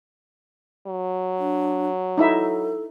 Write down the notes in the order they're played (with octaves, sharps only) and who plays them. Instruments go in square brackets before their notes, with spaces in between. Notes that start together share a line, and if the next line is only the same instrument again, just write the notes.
[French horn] F#3
[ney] D4
[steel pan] D#4 E4 E5 [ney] A4